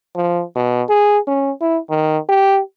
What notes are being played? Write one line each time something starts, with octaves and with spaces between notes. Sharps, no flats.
F3
B2
G#4
C#4
E4
D#3
G4